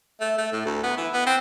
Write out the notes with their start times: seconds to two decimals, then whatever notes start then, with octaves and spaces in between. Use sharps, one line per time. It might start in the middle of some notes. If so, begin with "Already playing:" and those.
0.20 A3
0.38 A3
0.52 A2
0.65 D2
0.83 B3
0.98 E3
1.13 B3
1.27 C4